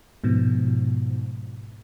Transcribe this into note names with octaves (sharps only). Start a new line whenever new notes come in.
G#2 B2 F3